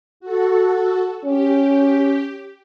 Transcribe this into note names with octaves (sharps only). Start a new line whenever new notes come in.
F#4 A4
C#4 G4